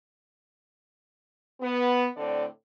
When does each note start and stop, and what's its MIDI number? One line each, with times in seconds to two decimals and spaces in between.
1.61 2.05 59
2.17 2.46 45
2.17 2.46 50
2.17 2.46 60
2.17 2.46 74